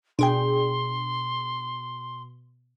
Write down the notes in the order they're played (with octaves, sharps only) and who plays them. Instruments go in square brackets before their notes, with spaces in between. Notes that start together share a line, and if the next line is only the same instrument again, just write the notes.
[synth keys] B2 [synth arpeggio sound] D4 G#4 G5 [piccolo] C6